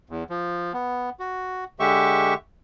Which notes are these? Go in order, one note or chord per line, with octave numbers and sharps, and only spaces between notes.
E2
F3
B3
F#4
D3 G#3 G4 E5 C#6